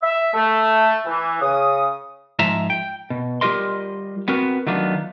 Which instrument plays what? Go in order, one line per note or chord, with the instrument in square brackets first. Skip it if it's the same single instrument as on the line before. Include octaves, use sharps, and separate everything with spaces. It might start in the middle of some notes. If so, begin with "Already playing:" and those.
[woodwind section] E5
A3
E3
C#3 D#6
[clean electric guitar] G#2 F3 E5 A#5
G5
B2
G3 F4 G4 A#4 D#5 C6
B3 C4 F#4 A#4 B4
D#3 F#3 A3 B3 D4 F4